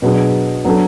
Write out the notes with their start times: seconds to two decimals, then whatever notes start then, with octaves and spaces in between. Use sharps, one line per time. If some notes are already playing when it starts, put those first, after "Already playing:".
0.02 B2 F#3 B3 D4 G#4
0.65 F#3 B3 D4 A4